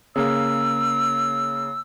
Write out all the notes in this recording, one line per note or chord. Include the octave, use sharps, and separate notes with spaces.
C#3 A#3 E6